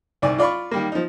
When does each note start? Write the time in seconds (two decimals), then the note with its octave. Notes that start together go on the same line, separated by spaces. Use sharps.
0.22 C2 G#2 D5 G#5
0.38 F4 D5 F5 B5 C#6
0.71 D#3 G3 A#3
0.92 F3 D#4